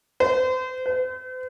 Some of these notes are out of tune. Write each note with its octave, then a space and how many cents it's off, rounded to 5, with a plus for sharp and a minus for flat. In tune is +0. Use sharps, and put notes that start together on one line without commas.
C5 -35
C5 -45